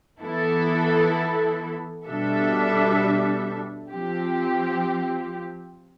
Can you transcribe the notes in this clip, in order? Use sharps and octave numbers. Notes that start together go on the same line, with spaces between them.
E3 B3 E4 A4
B2 G3 D4 A4 E5
F3 C4 G4